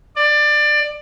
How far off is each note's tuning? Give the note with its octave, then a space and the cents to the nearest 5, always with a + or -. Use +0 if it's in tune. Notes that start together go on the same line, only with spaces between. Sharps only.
D5 +20